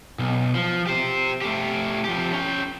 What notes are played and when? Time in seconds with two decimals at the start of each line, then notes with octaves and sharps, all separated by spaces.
0.19 B1
0.55 F3
0.87 G4 C5
1.42 A3 G4
2.04 F3 G4
2.33 C#4 G5